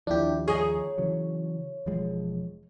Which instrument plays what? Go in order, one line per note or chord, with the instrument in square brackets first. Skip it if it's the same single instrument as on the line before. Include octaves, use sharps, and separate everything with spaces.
[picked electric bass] D#2 F3 [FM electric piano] D4 E4 G4
[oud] D#4 G#4 [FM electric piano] C#5
[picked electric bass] C#3 E3 F#3
E1 F3 G#3